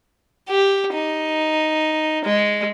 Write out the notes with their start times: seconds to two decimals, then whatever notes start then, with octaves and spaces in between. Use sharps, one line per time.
0.49 G4
0.93 D#4
2.25 G#3